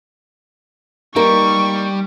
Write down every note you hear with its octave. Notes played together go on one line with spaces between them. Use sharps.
G3 A#3 D#4 A#4 C#6